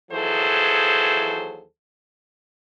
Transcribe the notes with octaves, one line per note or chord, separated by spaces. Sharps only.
D#2 E3 F#3 G#4 A4 C5